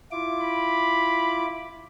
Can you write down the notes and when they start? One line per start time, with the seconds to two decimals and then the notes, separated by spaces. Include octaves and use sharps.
0.12 E4 F4 D6
0.41 B5